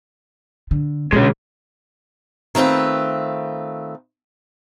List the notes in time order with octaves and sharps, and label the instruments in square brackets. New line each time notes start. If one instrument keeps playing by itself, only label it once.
[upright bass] D3
[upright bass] B2 D3 [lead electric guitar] G#3 C#4
[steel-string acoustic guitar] D#3 A3 C4 F4 B4